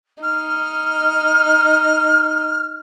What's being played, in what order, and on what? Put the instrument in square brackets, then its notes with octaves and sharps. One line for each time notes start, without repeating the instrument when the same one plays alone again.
[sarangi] D#4 [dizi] F6